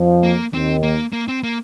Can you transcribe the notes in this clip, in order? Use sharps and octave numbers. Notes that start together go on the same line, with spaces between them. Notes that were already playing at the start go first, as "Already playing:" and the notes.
Already playing: F2 F3
A#3
D#2 D#3 C4
A#3
A#3
C4
A#3